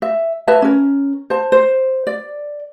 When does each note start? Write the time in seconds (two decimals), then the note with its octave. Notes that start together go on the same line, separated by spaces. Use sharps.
0.02 E5
0.47 B4 C#5 E5 A5
0.62 C#4 A#4
1.30 C5 A5
1.52 C5
2.07 D5